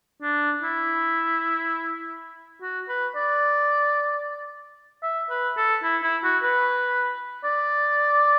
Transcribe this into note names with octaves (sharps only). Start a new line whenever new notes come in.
D4
E4
F#4
B4
D5
E5
B4
A4
E4
E4
F#4
B4
D5